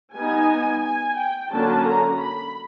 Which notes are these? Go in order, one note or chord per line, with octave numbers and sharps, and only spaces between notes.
G3 B3 D#4 G#5
G#5
G5
D3 F#3 A#3 C#4 A5
A#5
B5